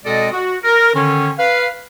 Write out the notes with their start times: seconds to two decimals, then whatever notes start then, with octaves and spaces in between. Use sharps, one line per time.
0.04 B2 G#3 C4 A4 D5 D#5
0.31 F#4
0.63 A#4
0.94 D3 D#3 C#4
1.38 B4 F5